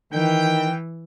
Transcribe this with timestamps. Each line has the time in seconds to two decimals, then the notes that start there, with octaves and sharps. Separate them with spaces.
0.13 D#3 E3 G5